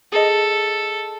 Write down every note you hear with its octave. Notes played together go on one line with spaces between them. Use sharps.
G#4 A4 D#5